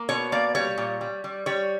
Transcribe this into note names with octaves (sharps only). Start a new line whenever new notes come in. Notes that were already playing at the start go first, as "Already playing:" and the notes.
Already playing: A#3
B2 C#5
A#3 D5
G3 C#5
A#2
G3
G3
G3 C#5